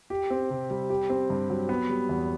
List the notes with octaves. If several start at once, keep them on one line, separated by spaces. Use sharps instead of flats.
G4
C4
C3
G3
G4
C4
G2
F#3
B3
G3
E2